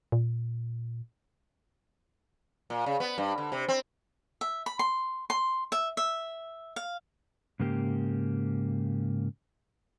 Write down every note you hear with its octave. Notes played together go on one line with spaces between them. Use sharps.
A#2
A#2
C#3
B3
G2
D3
C3
C4
E5
B5
C6
C6
E5
E5
F5
G#2 C#3 A#3 G4